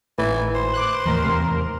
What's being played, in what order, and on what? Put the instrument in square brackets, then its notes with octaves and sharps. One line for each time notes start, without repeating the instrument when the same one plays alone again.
[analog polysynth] G#1 [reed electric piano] A2 B4 [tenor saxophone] E3
[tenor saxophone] C5
[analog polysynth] D6 F#6
[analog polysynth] D#2 A#4 C6 [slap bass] A2 E3 F3
[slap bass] E2 A3 [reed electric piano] C3